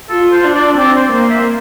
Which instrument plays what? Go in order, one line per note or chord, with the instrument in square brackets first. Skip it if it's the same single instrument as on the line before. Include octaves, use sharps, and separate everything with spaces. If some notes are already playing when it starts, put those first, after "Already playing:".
[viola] F4 [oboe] A4
[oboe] C5
[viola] D4
[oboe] D5
[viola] C4 [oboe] D5
[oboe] C5
[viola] A#3 [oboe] C5
[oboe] E5